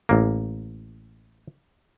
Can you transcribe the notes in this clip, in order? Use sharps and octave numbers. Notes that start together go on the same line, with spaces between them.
A1 A#3